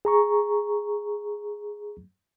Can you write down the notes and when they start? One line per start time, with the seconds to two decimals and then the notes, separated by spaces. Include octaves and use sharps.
0.05 G#4 A#5 C#6